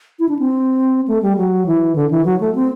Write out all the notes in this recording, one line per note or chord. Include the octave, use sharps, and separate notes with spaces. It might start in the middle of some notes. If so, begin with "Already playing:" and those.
E4
D4
C4
A3
G3
F#3
E3
D3
E3
F#3
A3
C4